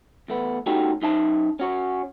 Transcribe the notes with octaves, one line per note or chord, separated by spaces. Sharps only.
E2 A3 B3
A3 C#4 D#4 F#4 G4 A4
F#2 D#4 E5 A5
C#4 F#4 C#5